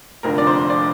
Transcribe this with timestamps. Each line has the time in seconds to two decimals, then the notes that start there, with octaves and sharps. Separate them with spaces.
0.23 F1 F2 D3 A#4
0.38 D5
0.47 C5
0.70 D5